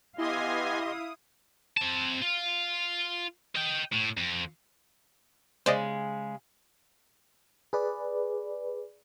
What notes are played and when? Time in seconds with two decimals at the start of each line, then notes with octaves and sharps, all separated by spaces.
0.18 B3 E4 G4 D#5 F5 G#5 C6 D#6
1.77 C4 A5
2.22 F4
3.55 D#5 G5
3.93 A2
4.17 F2
5.66 C#3 G#3 C5 D5 D#5
7.73 G#4 B4 D5